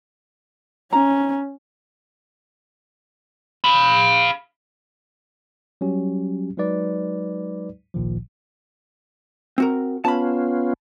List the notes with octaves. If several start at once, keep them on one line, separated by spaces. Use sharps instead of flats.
C#4 A#5
F5 B5
F#3 G3 C#4 G4
F#3 G#3 D#4 B4 D5
G#1 C#2 A#2 D#3 F3
C4 F#4 A#4
B3 C#4 F4 A5 B5